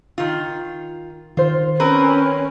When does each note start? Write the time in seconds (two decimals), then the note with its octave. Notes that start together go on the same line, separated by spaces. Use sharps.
0.18 D#3 F4
1.37 D#3 F4 C5
1.80 C4 C#4 A#4 B4